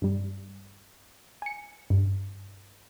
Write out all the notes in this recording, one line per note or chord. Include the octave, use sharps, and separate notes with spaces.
G2 G3
G#5 C#7
G2